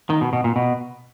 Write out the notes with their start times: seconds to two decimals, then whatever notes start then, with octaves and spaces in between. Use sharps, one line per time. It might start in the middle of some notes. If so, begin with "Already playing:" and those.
0.10 D#3
0.21 B2
0.33 B2
0.44 A#2
0.56 B2